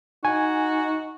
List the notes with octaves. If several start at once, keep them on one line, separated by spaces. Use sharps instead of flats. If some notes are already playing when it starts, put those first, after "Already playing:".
D#4 F#4 G#5